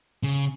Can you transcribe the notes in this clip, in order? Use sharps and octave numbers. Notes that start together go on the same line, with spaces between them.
C#3